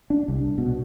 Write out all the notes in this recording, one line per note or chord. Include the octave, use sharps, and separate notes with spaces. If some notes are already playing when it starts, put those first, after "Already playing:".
D4
C2
B2